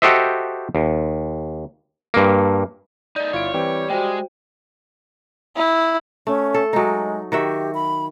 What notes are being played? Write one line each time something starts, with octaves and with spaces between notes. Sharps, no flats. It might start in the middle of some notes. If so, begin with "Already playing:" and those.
F#4 G4 A4 C5 D#5 E5
D#2
G2 A#3
A3 D#4 D5 G6
G1 E4 F4 C#5 D7
E3 G3 C4 B4 G5
G#3 F#4 C5 E5 G5
E4
A3 C#4
A4
F#3 G#3 D#4
D#3 F#4 G4 E5
B5